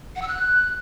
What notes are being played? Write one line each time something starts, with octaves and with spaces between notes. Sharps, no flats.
F#5
E6
F#6